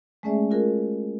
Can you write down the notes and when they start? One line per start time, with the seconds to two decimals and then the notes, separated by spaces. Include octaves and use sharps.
0.23 G#3 A3 C#4 G#4 D5 E5
0.51 F4 F#4 G#4 A#4